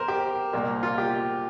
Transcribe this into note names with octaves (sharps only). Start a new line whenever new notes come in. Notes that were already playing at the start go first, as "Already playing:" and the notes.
Already playing: A#4 C5
G4
C2 A#2 A#3
F4
G4